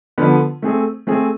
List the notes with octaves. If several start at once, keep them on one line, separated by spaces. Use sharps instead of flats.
D3 F3 B3
A3 C4 G#4
A3 C4 G#4